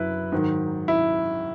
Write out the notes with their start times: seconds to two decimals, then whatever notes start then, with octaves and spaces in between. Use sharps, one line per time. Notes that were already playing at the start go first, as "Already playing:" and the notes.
Already playing: F#2 E4 B4
0.32 G#2 D#3 F#3
0.88 E4